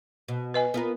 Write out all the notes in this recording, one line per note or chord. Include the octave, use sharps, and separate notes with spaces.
B2
B4 D#5 G#5
B3 F4 A#4